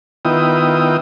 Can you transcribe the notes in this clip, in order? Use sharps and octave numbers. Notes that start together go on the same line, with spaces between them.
D#3 B3 E4 F4 G5 D#6